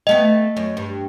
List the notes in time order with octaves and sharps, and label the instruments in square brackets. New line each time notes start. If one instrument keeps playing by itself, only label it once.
[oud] G3 A3 B3 [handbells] D#5
[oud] F#2
G2